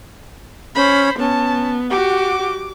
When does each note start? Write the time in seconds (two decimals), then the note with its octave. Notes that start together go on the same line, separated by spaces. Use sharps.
0.75 C#4 C5 B5
1.19 B3 C#4 A5
1.90 F#4 G4 F#5 D6